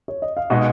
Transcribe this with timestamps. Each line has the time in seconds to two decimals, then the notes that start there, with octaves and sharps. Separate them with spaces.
0.08 C#5
0.22 D#5
0.37 F5
0.50 B2 G#3 D#4 D#5 F#5